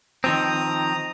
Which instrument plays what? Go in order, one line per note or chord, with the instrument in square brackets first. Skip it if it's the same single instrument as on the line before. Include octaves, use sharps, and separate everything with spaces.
[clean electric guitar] D#3 F3 C4 [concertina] A#5 D#6